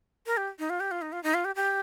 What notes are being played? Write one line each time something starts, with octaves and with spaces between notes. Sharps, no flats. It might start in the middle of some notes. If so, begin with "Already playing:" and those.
A#4
G4
D#4
F4
G4
F4
D#4
F4
D#4
F4
G4
G4